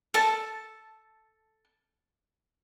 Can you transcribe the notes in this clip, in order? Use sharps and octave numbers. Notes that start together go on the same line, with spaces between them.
A4 A5